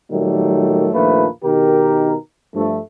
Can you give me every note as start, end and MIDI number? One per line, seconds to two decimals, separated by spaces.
0.12 0.88 46
0.12 0.88 51
0.12 0.88 54
0.12 0.88 55
0.12 0.88 57
0.12 0.88 58
0.94 1.27 34
0.94 1.27 39
0.94 1.27 53
0.94 1.27 57
0.94 1.27 58
0.94 1.27 71
1.44 2.15 47
1.44 2.15 51
1.44 2.15 63
1.44 2.15 67
1.44 2.15 70
2.56 2.79 43
2.56 2.79 53
2.56 2.79 57